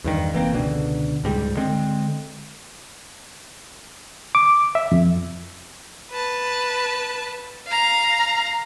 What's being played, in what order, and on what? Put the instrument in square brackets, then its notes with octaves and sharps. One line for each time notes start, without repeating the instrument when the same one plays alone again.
[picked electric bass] E2 G2 D#3
F1 E3 A#3 C4
C#2 B2 D3
C#2 G#2 G3
D3 G#3 C4
[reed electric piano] D6
E5
F2
[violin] B4 A5
F5 A#5